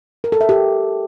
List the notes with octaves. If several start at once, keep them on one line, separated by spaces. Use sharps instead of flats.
A#4
A4
E5
G4